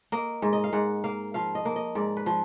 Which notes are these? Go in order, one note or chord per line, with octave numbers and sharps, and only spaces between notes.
A#3 D#5
G#2
D#5
F5
G#2 F#5
A#3 F5
F3 F5
D#5
A#3
D#5
G#2 D5
B4
F3